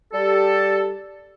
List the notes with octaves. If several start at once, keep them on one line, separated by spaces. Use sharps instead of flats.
G3 G4 A4